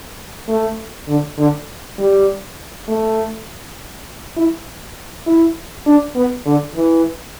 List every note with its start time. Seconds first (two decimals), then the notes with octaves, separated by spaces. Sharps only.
0.49 A3
1.08 D3
1.38 D3
1.98 G3
2.88 A3
4.37 E4
5.27 E4
5.86 D4
6.15 B3
6.46 D3
6.75 E3